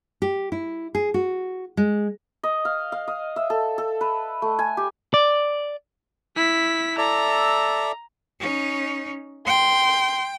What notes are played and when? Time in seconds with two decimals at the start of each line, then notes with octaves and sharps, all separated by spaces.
0.22 G4
0.52 E4
0.95 G#4
1.14 F#4
1.77 G#3
2.43 D#5
2.65 F5
2.92 F5
3.08 D#5
3.36 E5
3.50 A4
3.78 A4
4.01 B4
4.42 A3
4.59 G#5
4.77 G4
5.14 D5
6.37 E4 B6
6.98 A4 D5 E5 A#5
8.40 C#4 D#4
9.47 G5 C6